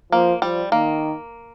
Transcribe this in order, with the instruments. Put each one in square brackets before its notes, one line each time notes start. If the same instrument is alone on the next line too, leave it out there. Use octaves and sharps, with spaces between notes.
[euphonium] F3 [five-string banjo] A#3
[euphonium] F3 [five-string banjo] G3
[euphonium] D#3 [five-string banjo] A#3